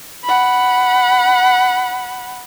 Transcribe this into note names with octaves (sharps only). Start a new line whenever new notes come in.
F#5 B5